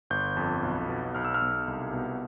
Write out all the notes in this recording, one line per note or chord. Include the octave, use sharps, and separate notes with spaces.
G1 G6
F2
B1
B2
B1 F6
E6
F6
B1
C2
B2